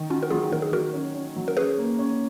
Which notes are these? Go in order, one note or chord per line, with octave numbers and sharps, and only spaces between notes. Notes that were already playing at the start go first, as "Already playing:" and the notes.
Already playing: D#3
C#4 F4 F#4
A#4
F#3 F4 G#4
D#3 A#4
G#4
F#3 F#4 A#4
C#4
C#4
F#3
A#4
C#4 G#4 B4
A#3
C#4